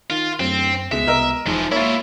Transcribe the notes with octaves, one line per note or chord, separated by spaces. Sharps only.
D#3 F4
D1 F#2 C4
C#2 B2 G#3 E5
C2 A#4 D#5 E6
E1 G#2 E3 F3
A#3 E4 F4 C#5 E5